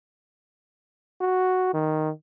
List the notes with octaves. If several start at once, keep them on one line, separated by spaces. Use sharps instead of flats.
F#4
D#3